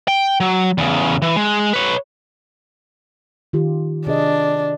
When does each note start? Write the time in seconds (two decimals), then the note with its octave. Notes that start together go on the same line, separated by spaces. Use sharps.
0.08 G5
0.40 F#3
0.78 E2 C#3
1.22 E3
1.36 G#3
1.73 B4 C#5
3.53 D#3 F4 G4
4.07 C3 D4 G#4 D#5